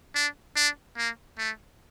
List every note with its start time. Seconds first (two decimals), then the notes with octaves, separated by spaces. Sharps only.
0.15 D4
0.56 D4
0.97 A#3
1.38 A3